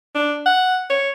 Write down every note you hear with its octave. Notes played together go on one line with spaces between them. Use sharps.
D4
F#5
C#5